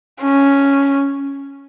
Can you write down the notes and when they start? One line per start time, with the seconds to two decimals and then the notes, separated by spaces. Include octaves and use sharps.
0.21 C#4